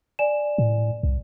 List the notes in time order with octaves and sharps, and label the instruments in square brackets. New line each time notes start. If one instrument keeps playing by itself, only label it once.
[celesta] D5 G#5 E7
[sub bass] A2
C2